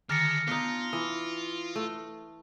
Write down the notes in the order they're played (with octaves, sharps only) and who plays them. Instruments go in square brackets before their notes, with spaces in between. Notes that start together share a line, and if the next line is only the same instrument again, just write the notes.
[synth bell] D3 D#3 A6 [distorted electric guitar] G#3 [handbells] F6 A#6 C#7
[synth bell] B3 [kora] D4 D#4 [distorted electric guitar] F4
[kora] E3 [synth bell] D#6
[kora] A3